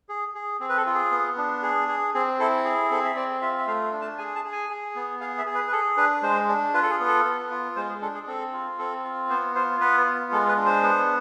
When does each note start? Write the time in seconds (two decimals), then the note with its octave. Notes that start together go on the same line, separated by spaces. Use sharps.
0.09 G#4
0.35 G#4
0.60 C4 G#4
0.69 B4
0.77 A4
0.86 F4
0.94 G#4
1.12 B3
1.37 D4
1.62 G#4
1.88 G#4
2.14 C4 G#4
2.40 E4 A4
2.64 G#4
2.90 C4 A4
3.04 E5
3.16 C4 D5
3.41 F4 E5
3.58 E5
3.67 A3 F5
3.92 D4
4.01 A5
4.18 G#4 G#5
4.35 A5
4.44 G#4
4.52 G#5
4.69 G#4
4.95 B3
5.21 G#4 F5
5.38 E5
5.46 G#4
5.55 B4
5.67 B4
5.72 G#4 A4
5.97 D4 B4
6.22 G#3 C5
6.48 D4
6.74 F4 B4
6.83 A4
6.91 G#4
7.00 B3
7.07 A4
7.25 B3
7.50 F4
7.76 G#3 C5
7.89 G#4
8.02 D4 A4
8.15 G#4
8.27 C4 A4
8.53 F4
8.78 C4 A4
9.04 F4
9.29 B3 C5
9.55 F4 C5
9.81 B3 B4
10.06 F4
10.32 G#3 A4
10.48 B4
10.57 D4
10.66 C5
10.82 B3